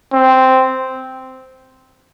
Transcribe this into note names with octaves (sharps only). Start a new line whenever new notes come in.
C4